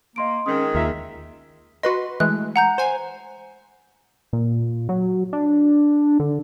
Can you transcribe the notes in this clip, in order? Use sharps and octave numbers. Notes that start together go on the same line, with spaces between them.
A#3 D#5 C6 D7
D#3 G#3 C4 C#4 D#6
D#2 F4 A#4 E5
F#4 B4 D#5 C6
E3 G#3 A3 F#6
F#5 A#5 G6
C5 G#5
A#2
F#3
D4
D3